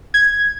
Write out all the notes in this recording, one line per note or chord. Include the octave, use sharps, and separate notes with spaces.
G#6